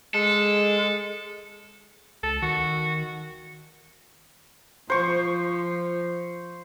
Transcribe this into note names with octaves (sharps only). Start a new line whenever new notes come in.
G#3 A4
C#2 A4
D#3 F#4
F3 C5 C#6